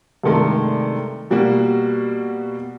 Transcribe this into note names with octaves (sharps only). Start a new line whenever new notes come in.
G2 C3 D#3 G#3 A3
B2 G3 A#3 F#4